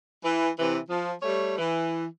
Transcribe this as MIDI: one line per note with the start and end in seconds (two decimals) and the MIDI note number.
0.23 0.47 52
0.58 0.77 48
0.58 0.77 52
0.90 1.12 53
1.22 1.56 55
1.22 1.56 57
1.22 1.56 73
1.58 2.04 52